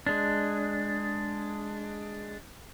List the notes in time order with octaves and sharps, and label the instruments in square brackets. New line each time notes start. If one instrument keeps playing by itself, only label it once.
[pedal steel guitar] G#3 D4